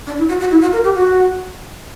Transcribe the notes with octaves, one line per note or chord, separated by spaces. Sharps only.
D4
E4
F#4
F#4
E4
F#4
A#4
G4
F#4